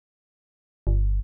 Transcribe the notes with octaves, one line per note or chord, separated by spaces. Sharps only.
G1